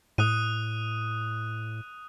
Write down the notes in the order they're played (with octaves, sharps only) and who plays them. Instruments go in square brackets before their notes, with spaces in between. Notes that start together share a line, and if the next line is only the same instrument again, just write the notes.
[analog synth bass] A2 [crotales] D#6 F#6 D#7